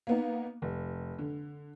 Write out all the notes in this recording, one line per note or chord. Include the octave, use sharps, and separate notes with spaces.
A#3 B3 D#4
F1
D3